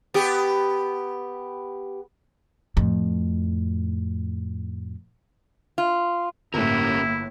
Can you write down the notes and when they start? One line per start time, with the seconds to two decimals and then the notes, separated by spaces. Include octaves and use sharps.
0.14 B3 G4
2.77 F2 A2
5.78 F4
6.54 G1 A2 A#3 C#4 E4 G4 A#4